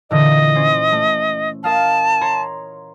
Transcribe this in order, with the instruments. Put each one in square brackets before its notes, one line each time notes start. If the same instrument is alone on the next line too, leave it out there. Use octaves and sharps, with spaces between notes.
[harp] A#2 D3 E3 [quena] D#5
[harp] C#4 C5
A3
[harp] A#4 D#5 F5 [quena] A5
[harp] C#5 A#5 C6